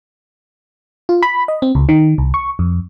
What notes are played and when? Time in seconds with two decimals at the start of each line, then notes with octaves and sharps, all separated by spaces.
1.09 F4
1.22 B5
1.48 D#5
1.62 C4
1.75 C#2
1.89 D#3
2.18 C2
2.34 C#6
2.59 F2